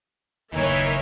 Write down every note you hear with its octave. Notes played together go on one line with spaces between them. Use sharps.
F#1 D#2 E3 D#4 A#4 C#5 E5